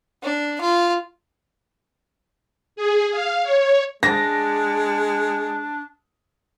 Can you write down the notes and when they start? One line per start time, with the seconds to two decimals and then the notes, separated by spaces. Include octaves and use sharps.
0.23 D4
0.61 F4
2.76 G#4
3.11 F5
3.43 C#5
4.03 G#3 D4 A#6